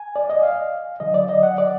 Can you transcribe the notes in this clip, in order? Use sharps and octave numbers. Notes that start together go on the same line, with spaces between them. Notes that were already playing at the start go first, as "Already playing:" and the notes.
Already playing: G#5
D5
D#5
F5
D3 F#3 D#5
D5
D#5
F#5
D5